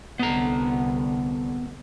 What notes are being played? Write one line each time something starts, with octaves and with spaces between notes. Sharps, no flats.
C2 D3 B3 A#5